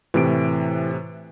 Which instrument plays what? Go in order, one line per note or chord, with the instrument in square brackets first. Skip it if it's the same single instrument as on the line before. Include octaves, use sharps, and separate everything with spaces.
[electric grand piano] A2 C3 D7 [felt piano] E3